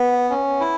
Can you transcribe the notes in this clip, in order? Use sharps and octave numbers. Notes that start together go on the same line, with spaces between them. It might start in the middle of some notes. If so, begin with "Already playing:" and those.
Already playing: B3
C#4
E4